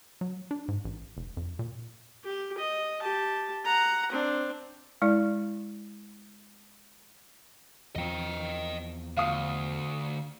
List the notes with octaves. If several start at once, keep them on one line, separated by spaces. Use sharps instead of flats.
F#3
D4
G#2
A1
F1
F2
A#2
G4
D#5
G4 A5
F#5 A#5
C4 D4
G#3 E4 D5
E2 F3 C4 D#5 G5
D2 F5 D#6